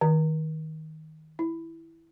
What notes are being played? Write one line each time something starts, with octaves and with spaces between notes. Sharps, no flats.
D#3
E4